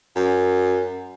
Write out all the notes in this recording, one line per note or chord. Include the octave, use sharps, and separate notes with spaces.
F#2